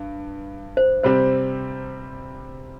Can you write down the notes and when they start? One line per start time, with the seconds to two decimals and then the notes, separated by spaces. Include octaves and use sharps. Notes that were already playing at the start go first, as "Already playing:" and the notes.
Already playing: G2
0.77 C5
1.03 C3 G3 C4 G4 C5